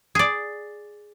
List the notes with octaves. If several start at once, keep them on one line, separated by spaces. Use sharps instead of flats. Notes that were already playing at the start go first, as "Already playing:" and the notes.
G#4 D5